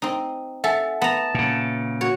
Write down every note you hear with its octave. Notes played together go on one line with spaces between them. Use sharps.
C4 D#4
A4 E5 F#5 G#5
B3 A5 A#5
A#2 C#3
F#4 C#5